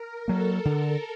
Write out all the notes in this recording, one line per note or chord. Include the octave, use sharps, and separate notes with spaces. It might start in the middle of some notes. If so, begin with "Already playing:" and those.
Already playing: A#4
F#3 A#3 A4
D3